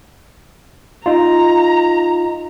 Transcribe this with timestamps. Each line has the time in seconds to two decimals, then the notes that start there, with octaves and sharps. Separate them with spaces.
1.06 D#4 F4 A#5